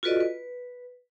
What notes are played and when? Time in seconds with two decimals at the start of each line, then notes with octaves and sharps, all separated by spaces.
0.03 F4 F#4 A4 B4 D5 D#5
0.20 B4